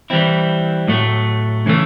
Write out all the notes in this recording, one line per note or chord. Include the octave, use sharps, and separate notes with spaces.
E3 G3 C4 E4
A2 F#3 A3
C#3 E3 A3